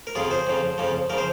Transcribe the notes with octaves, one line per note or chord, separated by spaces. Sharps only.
A#4
F2 C#3 F3 F4 G#4
G#4 C5
F2 C#3 F3
F2 C#3 F3
C#3 F3 A#4
C5